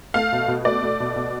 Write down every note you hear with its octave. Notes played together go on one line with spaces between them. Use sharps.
A3 F5
B2
B2
A3 D5
A3
B2
B2